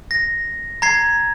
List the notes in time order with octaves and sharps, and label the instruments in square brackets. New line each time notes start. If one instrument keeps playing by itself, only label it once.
[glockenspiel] A#6
A#5 G#6 C7